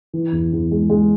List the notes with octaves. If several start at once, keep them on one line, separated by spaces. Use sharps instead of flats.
E3
E2
E2
G#3
G#3